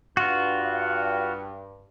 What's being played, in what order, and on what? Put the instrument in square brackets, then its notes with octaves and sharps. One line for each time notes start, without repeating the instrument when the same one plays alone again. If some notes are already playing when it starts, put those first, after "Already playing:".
[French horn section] G2 [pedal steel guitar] F4 F#4